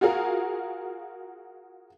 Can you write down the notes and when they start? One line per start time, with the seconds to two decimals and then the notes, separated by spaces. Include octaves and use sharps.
0.01 F4 F#4 G#4 A#4 F5